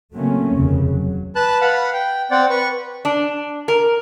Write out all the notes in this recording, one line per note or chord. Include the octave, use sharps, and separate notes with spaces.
C#3 F#3 A3 A#3 C4 C#4
F1 D#2 C#3
F#3
B4 A5 F#6
B4 F5 F#5 B5
G5
C4 D5 F#5 G5
B4 C#6
D4
A#4